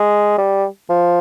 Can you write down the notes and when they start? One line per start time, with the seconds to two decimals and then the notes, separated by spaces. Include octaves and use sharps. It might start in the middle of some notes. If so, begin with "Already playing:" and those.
Already playing: G#3
0.38 G3
0.90 F3